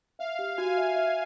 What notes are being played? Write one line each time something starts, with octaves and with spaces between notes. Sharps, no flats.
E5 F5
G4
F#4 G#5
E5
E5